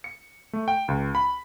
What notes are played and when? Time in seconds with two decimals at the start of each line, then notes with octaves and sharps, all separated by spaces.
0.04 C#7
0.53 A3
0.68 G5
0.88 C#2
1.15 B5